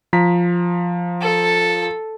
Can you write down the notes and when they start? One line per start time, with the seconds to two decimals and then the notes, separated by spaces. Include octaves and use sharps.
0.13 F3 A#5 B6
1.21 A4